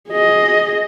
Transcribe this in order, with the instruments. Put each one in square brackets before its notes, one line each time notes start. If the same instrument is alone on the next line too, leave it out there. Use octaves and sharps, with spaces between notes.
[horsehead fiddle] G#4 D#5